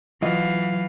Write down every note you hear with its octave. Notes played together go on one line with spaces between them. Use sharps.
E3 F#3 F4 D#5 F5